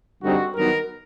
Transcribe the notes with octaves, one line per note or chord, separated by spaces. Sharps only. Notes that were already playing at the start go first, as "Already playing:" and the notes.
G2 D3 G3 C4 D#4 F#4
G2 D#3 F#3 B3 A#4